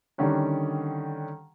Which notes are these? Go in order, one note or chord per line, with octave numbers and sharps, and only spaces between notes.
D3 D#3 G3 C#4 D4